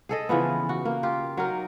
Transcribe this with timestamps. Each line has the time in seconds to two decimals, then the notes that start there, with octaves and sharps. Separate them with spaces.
0.09 G#4 A4 D#5
0.29 C#3 E3 F3 B3
0.69 F#4
0.85 A#3
1.03 F4 G4
1.37 F#3 D#4 A#4